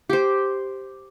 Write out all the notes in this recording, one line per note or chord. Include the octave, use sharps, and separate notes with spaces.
G4 C5